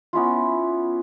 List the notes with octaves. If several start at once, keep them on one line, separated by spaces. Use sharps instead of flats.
B3 C#4 E4 F4